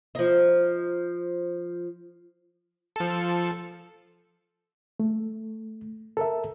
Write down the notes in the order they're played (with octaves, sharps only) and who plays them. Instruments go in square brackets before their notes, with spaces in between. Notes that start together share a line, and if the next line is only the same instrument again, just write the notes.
[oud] F3 D#4
[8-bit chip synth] F3 A4
[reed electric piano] A3
A4 A#4 E5